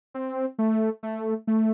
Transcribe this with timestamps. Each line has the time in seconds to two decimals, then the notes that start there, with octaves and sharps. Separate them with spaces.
0.14 C4
0.59 A3
1.03 A3
1.47 A3